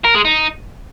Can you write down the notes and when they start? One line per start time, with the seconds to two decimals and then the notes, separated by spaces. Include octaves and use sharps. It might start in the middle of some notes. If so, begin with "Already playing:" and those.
0.04 A#4
0.15 G#3
0.25 D#4